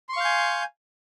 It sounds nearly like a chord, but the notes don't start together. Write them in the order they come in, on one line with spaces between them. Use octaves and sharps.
C6 C#6 F5 G6 G#5